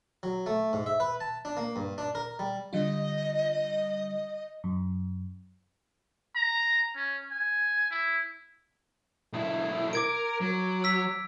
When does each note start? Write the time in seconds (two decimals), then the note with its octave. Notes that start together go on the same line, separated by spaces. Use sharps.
0.23 F#3
0.46 A3
0.73 G#2
0.86 E5
1.00 B4
1.20 A5
1.45 D4
1.57 A#3
1.76 G2
1.98 D4
2.15 A#4
2.39 G3
2.73 D3 G3 F4 D#5
4.64 F#2
6.35 A#5
6.96 C#4
7.31 G#5
7.91 E4
9.33 B1 E4
9.93 A#4 D6 G#6 D7
10.41 F#3
10.84 E6 B6